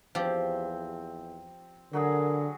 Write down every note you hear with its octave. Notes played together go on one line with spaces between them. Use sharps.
E2 F3 C4 G4
D3 F#3 F#4 G#4 A#4